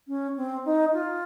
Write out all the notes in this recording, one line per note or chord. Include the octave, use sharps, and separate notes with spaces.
C#4
C4
D#4
F4